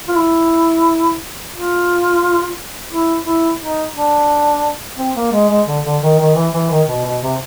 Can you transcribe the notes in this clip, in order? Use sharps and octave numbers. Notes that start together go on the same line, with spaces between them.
F4
E4
F4
E4
E4
D#4
D4
C4
A#3
G#3
G#3
D3
D3
D#3
D#3
E3
E3
D#3
B2
B2
C3